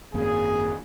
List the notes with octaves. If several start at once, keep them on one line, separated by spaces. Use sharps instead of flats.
G#1 F#2 A#3 G#4